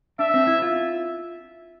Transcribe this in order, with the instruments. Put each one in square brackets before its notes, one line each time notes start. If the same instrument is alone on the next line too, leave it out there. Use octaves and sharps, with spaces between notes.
[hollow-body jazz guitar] D4 [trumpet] E5
[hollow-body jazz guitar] C4
E4
F4